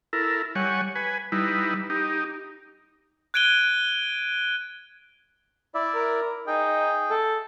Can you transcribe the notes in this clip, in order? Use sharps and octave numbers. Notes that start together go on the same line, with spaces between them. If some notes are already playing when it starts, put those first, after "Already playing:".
E4 A4 A#4
G3 C#5 F#5 G#5
B4 G#5
G3 D#4 E4 B4
D#4 G4
F#6 G#6 D7 D#7 G7
E4 D5 E5
A#4
D#4 G#4 G5
A4